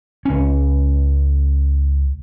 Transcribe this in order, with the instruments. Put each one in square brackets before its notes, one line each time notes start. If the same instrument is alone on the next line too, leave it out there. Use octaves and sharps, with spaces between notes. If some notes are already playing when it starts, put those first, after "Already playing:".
[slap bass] C#2 C#4